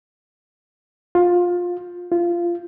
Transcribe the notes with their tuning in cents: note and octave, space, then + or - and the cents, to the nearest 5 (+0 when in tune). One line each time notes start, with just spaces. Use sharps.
F4 +20
F4 -15